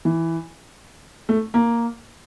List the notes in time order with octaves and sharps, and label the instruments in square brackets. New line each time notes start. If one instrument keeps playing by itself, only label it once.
[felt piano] E3
A3
A#3